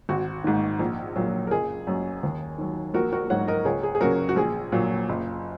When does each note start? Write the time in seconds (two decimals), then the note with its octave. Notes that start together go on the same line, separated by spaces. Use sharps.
0.09 G#1 F#4
0.44 G#2 D#3
0.79 A#1
1.16 A#2 F#3
1.47 A#4
1.51 F#1 G#4
1.87 F#2 F#3
2.23 D#2
2.58 D#3 F#3
2.94 A#1 F#4 A#4
3.13 F#4 A#4
3.30 G#2 F#3 C#5 F#5
3.48 A#4 D#5
3.65 C#2 G#4 C#5
3.83 G#4
3.95 G#4
4.01 C#3 F#3 F#4 A#4
4.29 F#4
4.36 A#1 G#4
4.72 A#2 F#3
5.09 F#1